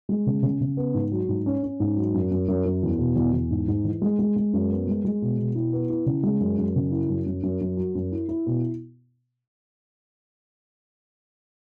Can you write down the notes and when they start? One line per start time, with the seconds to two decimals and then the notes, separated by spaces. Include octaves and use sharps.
0.09 G#3
0.26 C#3
0.43 C#3
0.61 C#3
0.77 B3
0.94 G#2
1.12 F#3
1.29 G#2
1.46 C#4
1.63 C#4
1.80 G#2
1.96 F#3
2.14 F#2
2.31 F#2
2.48 F#2
2.65 F#2
2.83 E2
2.99 B2
3.16 E2
3.33 E2
3.51 G#2
3.68 G#2
3.85 E3
4.02 G#3
4.19 G#3
4.36 G#3
4.53 F#2
4.70 B3
4.87 G#3
5.05 G#3
5.22 B2
5.38 B2
5.55 E4
5.73 B3
5.90 E4
6.06 C#3
6.23 G#3
6.40 F#2
6.58 F#2
6.76 C#3
6.92 E4
7.09 F#2
7.26 F#2
7.43 F#2
7.61 F#2
7.77 F#3
7.95 F#2
8.12 E4
8.29 E4
8.46 B2